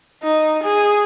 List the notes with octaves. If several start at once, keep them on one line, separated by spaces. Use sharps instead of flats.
D#4
G#4